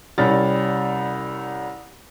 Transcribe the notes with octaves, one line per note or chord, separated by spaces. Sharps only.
C2 G3 C#4 A6